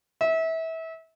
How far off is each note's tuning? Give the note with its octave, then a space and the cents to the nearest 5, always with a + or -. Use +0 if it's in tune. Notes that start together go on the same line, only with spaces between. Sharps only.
E5 -25